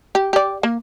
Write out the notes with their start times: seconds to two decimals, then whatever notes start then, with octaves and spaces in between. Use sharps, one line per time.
0.15 G4
0.33 G4 D5
0.63 A#3